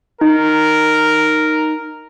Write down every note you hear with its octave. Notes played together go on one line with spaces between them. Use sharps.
D#4 A#4